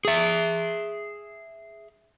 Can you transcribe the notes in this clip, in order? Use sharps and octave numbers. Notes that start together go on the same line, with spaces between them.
G#4 E5